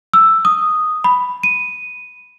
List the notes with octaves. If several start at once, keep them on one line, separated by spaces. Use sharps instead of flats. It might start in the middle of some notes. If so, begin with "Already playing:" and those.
E6
D#6
B5
D#7